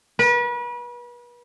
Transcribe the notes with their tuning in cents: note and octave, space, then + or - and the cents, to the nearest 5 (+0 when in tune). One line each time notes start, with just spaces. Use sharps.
B4 -35